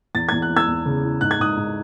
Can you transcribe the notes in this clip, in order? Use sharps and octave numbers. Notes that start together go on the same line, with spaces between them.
E2 A6
E2 G#6
F#6
E3
E6 G#6
E2
C#3
E3
G#2 F#6
G#6
G#2 D#6 F#6
G#2